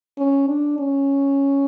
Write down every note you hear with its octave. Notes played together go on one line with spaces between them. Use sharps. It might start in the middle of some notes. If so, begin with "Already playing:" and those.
C#4
D4
C#4